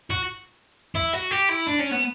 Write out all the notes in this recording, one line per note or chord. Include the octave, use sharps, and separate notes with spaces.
F#4
E4
F#4
G4
E4
D4
C#4
B3